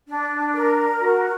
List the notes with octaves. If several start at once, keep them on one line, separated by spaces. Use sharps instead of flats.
D4
A#4
F#4